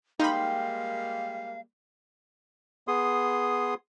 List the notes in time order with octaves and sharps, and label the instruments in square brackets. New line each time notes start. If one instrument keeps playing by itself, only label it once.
[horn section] G3 G#3 A#3 [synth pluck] D#4 B5 [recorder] F5 [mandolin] G5 C6
[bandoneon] B3 G#4 C6 D#6